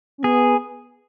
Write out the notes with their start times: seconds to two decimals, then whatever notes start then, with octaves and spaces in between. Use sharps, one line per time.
0.18 C#4
0.23 B3 G#4